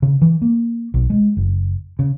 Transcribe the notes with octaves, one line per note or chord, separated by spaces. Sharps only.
C#3
E3
A#3
B1
G#3
F#1
C#3